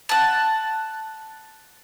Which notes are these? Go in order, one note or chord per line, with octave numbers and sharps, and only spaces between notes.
F#5 A5